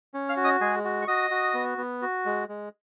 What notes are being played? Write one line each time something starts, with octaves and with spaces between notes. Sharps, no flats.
C#4
F5 F6
F#4
D#5 D#6
G#3 G#4 G#5
F#4
C#6
F#4 D#5 D#6
F#4
B3
B3
F#4
G#3
G#3